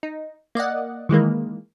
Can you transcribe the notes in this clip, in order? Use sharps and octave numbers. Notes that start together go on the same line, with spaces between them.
D#4
A#3 D5 D#5 F#5
D#3 E3 G#3 A#3